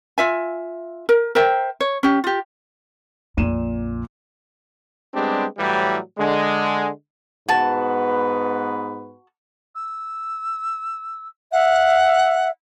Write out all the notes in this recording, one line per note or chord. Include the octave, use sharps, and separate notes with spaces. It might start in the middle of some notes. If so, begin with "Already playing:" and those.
F4 E5 G#5
A#4
A#4 C5 E5 G5
C#5
C#4 G4
F4 G4
A#1 F2 A#2 D#7 E7
G3 G#3 B3 C4 D4 G4
A2 E3 F#3 G3
D3 G#3
G#2 B3 F#4 B4 A5
E6
E5 F#5